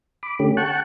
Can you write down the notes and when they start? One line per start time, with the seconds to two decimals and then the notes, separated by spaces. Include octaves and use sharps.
0.23 B5 D6
0.39 D3 A3 C#4 G4
0.57 F#5 G5 A5 C#6 F#6